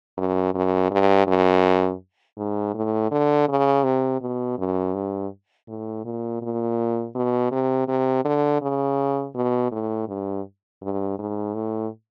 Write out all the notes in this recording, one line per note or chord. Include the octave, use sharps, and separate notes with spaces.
F#2
F#2
G2
F#2
G#2
A2
D3
C#3
C3
B2
F#2
G2
A2
A#2
A#2
B2
C3
C3
D3
C#3
B2
A2
G2
G2
G#2
A2